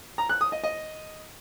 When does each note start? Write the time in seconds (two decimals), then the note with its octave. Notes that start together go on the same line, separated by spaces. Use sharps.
0.18 A#5
0.29 F#6
0.41 D#6
0.52 D#5
0.64 D#5